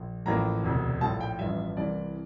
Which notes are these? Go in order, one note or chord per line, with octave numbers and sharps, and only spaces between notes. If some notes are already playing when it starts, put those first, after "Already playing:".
Already playing: A#1
A1 A2 F3 A#3 A#5
E1 D2 C3
A#1 A2 F3 A5
G5
A1 G2 F3 E5
C2 C3 E3 D5